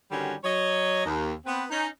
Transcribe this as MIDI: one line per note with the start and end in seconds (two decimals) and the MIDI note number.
0.11 0.33 43
0.11 0.33 50
0.11 0.33 51
0.11 0.33 55
0.11 0.33 61
0.11 0.33 66
0.44 1.04 54
0.44 1.04 73
0.44 1.04 75
1.05 1.32 39
1.46 1.63 59
1.46 1.63 60
1.46 1.63 71
1.70 1.87 61
1.70 1.87 63